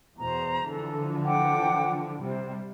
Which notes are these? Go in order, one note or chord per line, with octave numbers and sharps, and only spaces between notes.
E2 B2 C5 A#5
D3 E3 F3 A4
F#5 G5 D6
C3 G3 C5